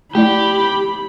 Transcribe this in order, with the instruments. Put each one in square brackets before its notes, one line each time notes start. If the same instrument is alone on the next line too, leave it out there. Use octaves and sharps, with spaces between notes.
[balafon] A3 E4 D5 [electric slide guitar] G4 [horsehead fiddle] B5